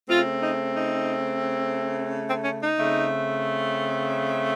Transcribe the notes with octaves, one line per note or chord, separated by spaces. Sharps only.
C#3 A3 C4 F4
D#4
D#4
C4
C#4
D#4
C#3 A3 C4